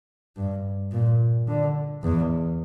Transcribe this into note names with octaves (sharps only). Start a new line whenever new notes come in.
G2
A#2
D3
E2